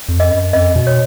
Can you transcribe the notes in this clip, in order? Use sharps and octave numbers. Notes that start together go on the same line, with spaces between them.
F2
D#5
F#2
F2 D#5
B2
C#5